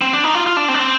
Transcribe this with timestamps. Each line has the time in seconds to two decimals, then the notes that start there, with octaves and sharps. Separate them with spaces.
0.01 C4
0.13 D4
0.24 D#4
0.34 F4
0.46 F4
0.57 D4
0.68 C4
0.74 D4
0.79 C4